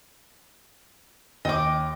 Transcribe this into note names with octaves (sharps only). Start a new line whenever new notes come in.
D#2 D#5 G5 D6